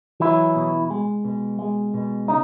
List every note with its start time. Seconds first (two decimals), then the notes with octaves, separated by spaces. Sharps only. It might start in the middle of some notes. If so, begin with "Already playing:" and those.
0.20 E3 F#3 E4
0.55 B2
0.90 G#3
1.25 B2
1.59 G#3
1.94 B2
2.28 C#3 D#4